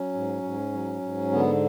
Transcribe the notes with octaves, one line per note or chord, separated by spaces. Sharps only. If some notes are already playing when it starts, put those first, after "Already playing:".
Already playing: F#3 C#4
G#2
G#2
F#3
G#2
D3 B3